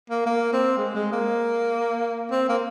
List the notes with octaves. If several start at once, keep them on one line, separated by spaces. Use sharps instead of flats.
A#3
A#3
C4
G#3
G#3
A#3
C4
A#3